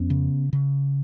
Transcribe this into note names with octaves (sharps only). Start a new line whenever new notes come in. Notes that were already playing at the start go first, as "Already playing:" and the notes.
Already playing: F2 B3 C#4
C#3
C#3